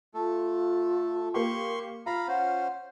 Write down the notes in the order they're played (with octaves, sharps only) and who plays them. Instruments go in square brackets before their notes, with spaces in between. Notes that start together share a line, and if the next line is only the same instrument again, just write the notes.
[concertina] A3 A4 [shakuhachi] F4
[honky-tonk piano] A#3 G4 [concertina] C6 C#6
[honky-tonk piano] F4 [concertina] F5 A#5 B5
[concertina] C#4 C5 [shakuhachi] F#5